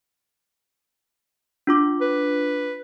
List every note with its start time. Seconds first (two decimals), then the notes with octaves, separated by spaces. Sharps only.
1.67 D4 F4 D6
2.01 B4